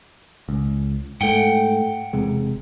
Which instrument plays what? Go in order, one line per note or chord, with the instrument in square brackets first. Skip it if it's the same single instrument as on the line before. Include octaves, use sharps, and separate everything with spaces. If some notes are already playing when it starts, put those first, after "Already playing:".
[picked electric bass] C#2
[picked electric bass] G#2 A3 [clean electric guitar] F#5 G5
[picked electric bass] E1 C3 G#3